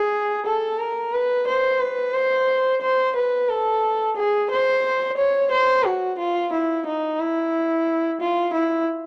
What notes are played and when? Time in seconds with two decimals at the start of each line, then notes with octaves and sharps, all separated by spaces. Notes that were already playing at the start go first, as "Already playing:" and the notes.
Already playing: G#4
0.46 A4
0.79 A#4
1.13 B4
1.47 C5
1.80 B4
2.14 C5
2.81 C5
3.16 B4
3.49 A4
4.16 G#4
4.50 C5
5.17 C#5
5.51 C5
5.84 F#4
6.18 F4
6.53 E4
6.86 D#4
7.20 E4
8.21 F4
8.54 E4